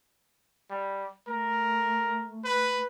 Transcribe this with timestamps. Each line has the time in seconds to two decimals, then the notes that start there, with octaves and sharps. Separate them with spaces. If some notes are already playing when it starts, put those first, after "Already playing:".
0.70 G3
1.27 A3 A#4
2.44 B4